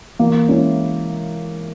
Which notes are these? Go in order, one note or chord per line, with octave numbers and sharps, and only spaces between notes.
E3 A#3
G#3 C#4 E4